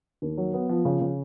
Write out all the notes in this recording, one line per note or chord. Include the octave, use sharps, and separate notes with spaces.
D#2
F#3
B3
F3
C#3
C#3